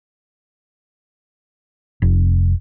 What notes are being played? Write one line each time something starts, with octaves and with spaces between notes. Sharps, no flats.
F1